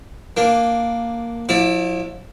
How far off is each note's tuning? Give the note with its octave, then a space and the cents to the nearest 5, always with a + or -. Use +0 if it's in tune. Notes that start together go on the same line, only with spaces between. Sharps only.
A#3 +0 D4 +0
F3 +40 E4 +0 D5 +15